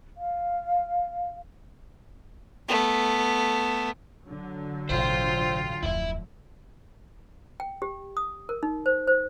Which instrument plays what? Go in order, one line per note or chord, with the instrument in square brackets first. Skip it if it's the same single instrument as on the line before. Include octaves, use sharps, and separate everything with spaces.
[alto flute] F5
[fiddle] A3 B3
[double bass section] D3 F#3
[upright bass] A1 B2 [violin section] F4 G5 [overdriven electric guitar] C5
[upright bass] D1 F2 [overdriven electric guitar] E4 E5
[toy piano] G5
G4
D#6
A#4
D#4
C5
C5